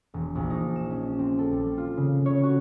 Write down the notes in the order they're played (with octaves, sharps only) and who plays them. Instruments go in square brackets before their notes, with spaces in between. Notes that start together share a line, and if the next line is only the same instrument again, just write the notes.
[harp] E1
A#1
D#4
E7
C#4
C4
A4
G3
F4
C#3
C#5
F#4